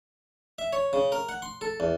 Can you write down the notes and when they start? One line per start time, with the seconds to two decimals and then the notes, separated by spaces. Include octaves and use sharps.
0.58 E5
0.73 C#5
0.93 C#3
1.12 A#4
1.29 F#5
1.42 C6
1.61 A4
1.80 E2